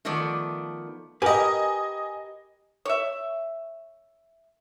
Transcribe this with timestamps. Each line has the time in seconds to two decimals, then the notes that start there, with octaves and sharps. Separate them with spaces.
0.05 D#3 F3 A3 B3 D5
1.22 G4 A#4 B4 D#5 G#5
2.85 C#5 E5